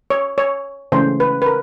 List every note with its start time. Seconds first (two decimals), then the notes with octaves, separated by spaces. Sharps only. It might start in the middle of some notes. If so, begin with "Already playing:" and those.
0.10 C#5
0.38 C#5
0.92 C#3 E3 A3 C5
1.20 B4
1.42 B4
1.46 A#4